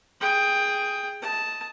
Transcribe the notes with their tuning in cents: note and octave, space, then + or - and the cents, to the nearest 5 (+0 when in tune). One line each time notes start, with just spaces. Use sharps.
G#4 +0 G5 +15
D#5 +15 A5 +0